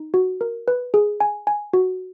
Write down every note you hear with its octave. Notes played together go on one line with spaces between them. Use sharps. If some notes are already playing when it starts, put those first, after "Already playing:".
Already playing: D#4
F#4
A#4
B4
G#4
G#5
G#5
F#4